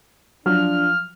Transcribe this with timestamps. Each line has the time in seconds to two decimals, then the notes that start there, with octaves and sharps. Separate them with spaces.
0.46 F3 F#3 D4 F6